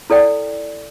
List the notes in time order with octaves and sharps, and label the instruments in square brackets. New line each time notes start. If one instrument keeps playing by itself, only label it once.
[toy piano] E4 A4 D5 G5